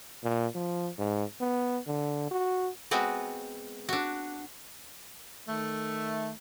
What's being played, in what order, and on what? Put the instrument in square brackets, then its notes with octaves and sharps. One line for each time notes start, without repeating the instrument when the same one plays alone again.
[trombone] A#2
F3
G#2
B3
D3
F#4
[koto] G#3 B3 C4 F#4
D4 F#4
[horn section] D#3 A3